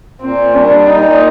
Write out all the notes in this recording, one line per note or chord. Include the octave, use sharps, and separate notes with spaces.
A#2 C4
G3 D4
A#2 D#4